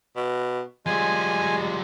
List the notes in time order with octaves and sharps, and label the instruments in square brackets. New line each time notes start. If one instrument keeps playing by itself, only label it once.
[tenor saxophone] B2
[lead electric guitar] F3 G3 [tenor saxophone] G#3 [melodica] G#5